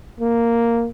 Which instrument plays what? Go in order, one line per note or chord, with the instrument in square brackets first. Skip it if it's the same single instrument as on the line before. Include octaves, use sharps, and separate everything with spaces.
[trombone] A#3